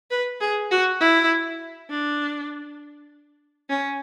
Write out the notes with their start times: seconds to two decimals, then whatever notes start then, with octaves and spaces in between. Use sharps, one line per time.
0.11 B4
0.41 G#4
0.71 F#4
1.00 E4
1.90 D4
3.69 C#4